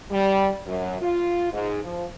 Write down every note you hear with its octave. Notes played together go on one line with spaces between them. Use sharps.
G3
F#2
F4
G#2
F3